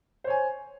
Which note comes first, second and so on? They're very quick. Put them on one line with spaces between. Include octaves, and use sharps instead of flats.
C5 C#5 G#5